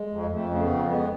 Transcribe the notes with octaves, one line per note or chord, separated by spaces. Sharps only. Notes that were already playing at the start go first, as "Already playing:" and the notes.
Already playing: G#3
F2
F2 A3
C#3 A3
B3
F2
G#3 B3